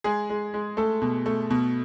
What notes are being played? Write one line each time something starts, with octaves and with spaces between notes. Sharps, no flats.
G#3 G#4
G#3
G#3
A3 A4
B2
A3
B2